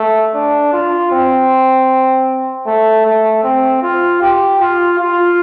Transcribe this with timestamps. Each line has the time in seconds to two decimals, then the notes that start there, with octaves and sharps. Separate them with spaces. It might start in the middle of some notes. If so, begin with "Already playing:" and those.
Already playing: A3
0.34 D4
0.73 F4
1.12 C4
2.66 A3
3.05 A3
3.43 C4
3.82 F4
4.21 G4
4.60 F4
4.98 F4